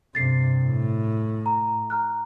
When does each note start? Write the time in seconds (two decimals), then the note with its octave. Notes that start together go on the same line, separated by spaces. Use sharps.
0.15 G2 C3 A6 C7
0.63 A2
1.46 A#5
1.90 A#5 F6 F#6